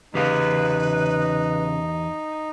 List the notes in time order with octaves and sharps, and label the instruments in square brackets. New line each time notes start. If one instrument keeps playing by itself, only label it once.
[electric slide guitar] E2 G4 F5 [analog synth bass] C#3 [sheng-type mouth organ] D#4 [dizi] B4